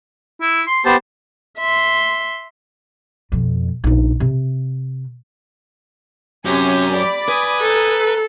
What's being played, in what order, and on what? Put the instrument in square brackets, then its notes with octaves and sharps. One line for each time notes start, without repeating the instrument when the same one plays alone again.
[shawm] E4
C6
[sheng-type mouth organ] B3 G4 C5 [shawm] A5
[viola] E5 C6
[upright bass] F2 B2
A#1 D#4
C3
[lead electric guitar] F#2 [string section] C3 C#4 G#5 [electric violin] G4
[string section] D5 B5 D6
[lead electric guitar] B4 [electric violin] G#5 D#6
[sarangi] A4 [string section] A#5